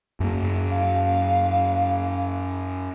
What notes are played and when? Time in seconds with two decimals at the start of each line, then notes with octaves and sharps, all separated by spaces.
0.20 F#2 A#3
0.71 F5